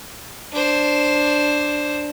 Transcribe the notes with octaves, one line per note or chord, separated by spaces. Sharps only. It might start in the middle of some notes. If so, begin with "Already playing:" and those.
D4 C5